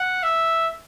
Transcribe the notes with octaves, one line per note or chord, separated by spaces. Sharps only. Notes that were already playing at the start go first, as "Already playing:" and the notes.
Already playing: F#5
E5